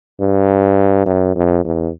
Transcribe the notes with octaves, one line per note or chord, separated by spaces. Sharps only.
G2
F#2
F2
E2